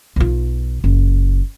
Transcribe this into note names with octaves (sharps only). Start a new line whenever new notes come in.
B1 F4
F#1